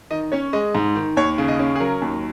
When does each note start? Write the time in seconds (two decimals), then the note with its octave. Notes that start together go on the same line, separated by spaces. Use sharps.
0.11 D#3 D#5
0.32 C#4 C#5
0.53 G#3 D#5
0.75 G#2
0.96 D#3
1.17 D#2 C#5
1.38 C#3
1.48 D#5
1.59 C#4
1.76 G#4
1.80 F#3 A#4
2.02 D#2